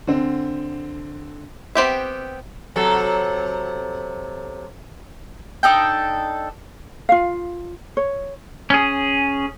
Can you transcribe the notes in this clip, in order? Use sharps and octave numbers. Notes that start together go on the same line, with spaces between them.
D3 C4
B3 C4 G4 E5
C3 F#3 A4
D4 D#4 A4 G5
F4 F5
C#5
C#4 G#4